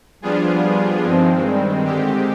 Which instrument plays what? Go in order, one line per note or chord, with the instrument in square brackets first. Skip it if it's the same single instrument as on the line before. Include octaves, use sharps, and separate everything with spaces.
[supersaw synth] F3 B3 D4 F4 G#4 [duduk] G3
[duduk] G3
[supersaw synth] G2 D#3 G#3 C4 [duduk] F3
[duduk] G3
[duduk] D3 [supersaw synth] D#3 G#3 C4 G4